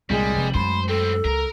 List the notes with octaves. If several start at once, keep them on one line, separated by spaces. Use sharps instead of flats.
C2 A#2 G3 G#3
F1
F#2 G#3 A3 C5 B5
B3 C4 A4
C#2 A#4